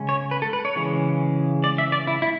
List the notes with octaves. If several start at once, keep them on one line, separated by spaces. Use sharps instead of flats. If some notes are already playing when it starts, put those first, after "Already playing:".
Already playing: C#3 G#3 C#4
C#5
B4
A4
B4
C#5
C#3 E3 G#3
D5
E5
D5
E4
E4